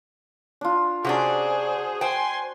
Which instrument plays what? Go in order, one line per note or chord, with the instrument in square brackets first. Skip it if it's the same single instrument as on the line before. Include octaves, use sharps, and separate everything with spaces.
[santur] D4 F4
[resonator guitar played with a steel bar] C3 C#4 D4 [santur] F#4 D6 [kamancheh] G#4 C5
[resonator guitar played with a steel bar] C5 G5 [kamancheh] G#5 C6